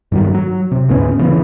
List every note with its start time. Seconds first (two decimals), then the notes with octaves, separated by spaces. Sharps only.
0.12 G2 D#3 F#3
0.35 F#3
0.71 C3
0.88 D2 G#2 B3 C#4
1.19 C#3 E3 B3